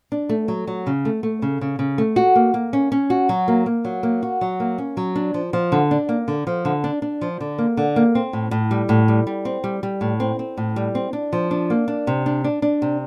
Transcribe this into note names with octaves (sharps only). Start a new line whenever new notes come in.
D4
A3
F#3
F#3
C#3
A3
A3
C#3
C#3
C#3
A3
F#4
A#3
A#3
C#4
C#4
F#4
F#3
A#3
A#3
F#3
A#3
F#4
F#3
A#3
C#4
F#3
D4
F3
F3
D3
D4
A#3
D3
F3
D3
D4
D4
F3
D3
A#3
D3
A#3
C4
A2
A2
G3
A2
G3
G3
C4
G3
G3
A2
C4
C4
A2
G3
C4
D4
F3
D4
A#3
D4
C3
D4
D4
D4
C3